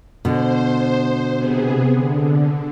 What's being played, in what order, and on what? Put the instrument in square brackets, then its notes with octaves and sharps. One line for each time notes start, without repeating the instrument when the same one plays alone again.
[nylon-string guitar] B2 D3 [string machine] C5
[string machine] C3 B3 G#4
D3